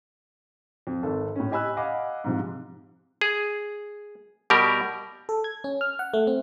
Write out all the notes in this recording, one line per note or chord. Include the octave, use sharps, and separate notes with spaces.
F2
G#1 A4
A2 C#4
G4 D#5 G#5 B5 E6 F#6
D#5 F5 F#5 G#5 B5 D6
G#2 C3 F3
G#4
B2 G3 G4 A#4
A4
G#6
C#4
F6
F#5
A3
C4